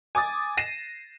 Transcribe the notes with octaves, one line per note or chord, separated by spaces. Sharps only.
G#5 D6 D#6 A6
A#6 C7 D#7 E7